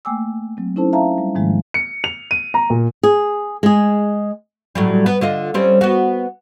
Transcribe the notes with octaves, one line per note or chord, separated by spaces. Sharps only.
A3 A#3 G5 G#5 D6 E6
F#3 C4
C#4 D#4 E4 A4 C5 A5
E5 F5 A5 A#5
G3
G#2 D#3 F3 G#3 A#3
C#7
F7
D#7
A#5
A#2
G#4
G#3 G#4
A2 F#3 G3
B3
D3 F4 D#5
G3 C4 C#4
B3 F#4